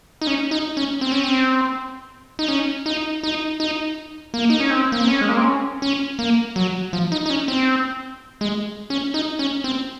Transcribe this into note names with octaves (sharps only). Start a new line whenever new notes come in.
D#4
C#4
D#4
C#4
C4
C#4
C4
D#4
C#4
D#4
D#4
D#4
A#3
D#4
C#4
C4
A#3
C4
C#4
G#3
A#3
C4
C#4
C#4
A#3
F#3
F3
D#4
D#4
C#4
C4
G#3
C#4
D#4
C#4
C4